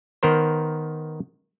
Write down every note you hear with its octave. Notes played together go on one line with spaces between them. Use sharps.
D#3 B3 A#4 C5